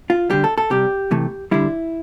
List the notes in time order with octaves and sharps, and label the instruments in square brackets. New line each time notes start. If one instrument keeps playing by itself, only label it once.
[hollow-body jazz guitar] F4
D3 G3 G4
A4
A4
C3 G3 G4
C3 E3 A3
D3 G3 E4